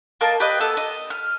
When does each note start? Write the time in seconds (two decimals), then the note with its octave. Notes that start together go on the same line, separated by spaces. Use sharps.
0.21 A#3 A#4 D#5 A5
0.40 G4 B4 D#5
0.60 B3 A4
0.77 D#5
1.10 F6